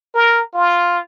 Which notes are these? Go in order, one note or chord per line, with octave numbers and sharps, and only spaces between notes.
A#4
F4